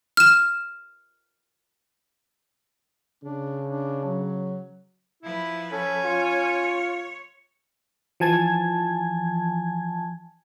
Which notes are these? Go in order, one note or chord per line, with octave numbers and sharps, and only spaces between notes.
F6 E7
C#3 D4
D4
F#3
F3 E4 B4
C#4 A4
F4 C#5
E3 F3 G#5 A5 G#6